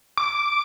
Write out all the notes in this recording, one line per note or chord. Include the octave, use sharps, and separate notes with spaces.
D6